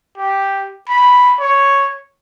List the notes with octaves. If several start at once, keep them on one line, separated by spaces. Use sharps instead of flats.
G4
B5
C#5